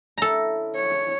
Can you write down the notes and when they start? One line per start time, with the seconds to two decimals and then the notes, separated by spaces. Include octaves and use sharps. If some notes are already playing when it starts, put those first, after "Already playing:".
0.18 D3 C#4 E4 A4 A#5
0.76 C#5